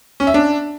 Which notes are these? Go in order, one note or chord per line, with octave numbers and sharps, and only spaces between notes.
C#4
E5
D4